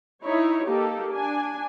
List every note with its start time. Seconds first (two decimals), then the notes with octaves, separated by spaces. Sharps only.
0.24 D#4 E4 C#5
0.67 A#3 D#4 G4 A4
1.13 D4 G#5